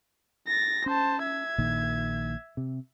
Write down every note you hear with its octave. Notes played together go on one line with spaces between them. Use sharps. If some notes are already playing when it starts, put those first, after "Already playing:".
A6 A#6
C#4 C5 A5
E5 G#6
A#1 A#2 D#3
C3